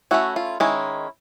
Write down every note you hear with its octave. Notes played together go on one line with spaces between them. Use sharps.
A3 C#4 E4 F#4
F4
D#3 G#3 C#4 E4